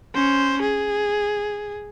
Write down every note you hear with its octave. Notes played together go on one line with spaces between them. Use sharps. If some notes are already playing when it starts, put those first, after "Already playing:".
C#4 C5
G#4